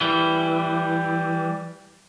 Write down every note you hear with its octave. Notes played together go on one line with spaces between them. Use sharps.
E3 G3